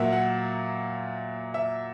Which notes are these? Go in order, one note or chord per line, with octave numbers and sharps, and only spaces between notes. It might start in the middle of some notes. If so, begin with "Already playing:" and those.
Already playing: A#2 F#3 A#3 E5 F#5
F#5
E5